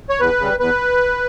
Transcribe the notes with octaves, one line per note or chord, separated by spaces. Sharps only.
C#5
E2 B4
C#3 G3
E2 B4